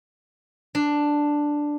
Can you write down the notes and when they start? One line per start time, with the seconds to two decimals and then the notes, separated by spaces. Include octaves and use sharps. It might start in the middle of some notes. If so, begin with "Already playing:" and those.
0.75 D4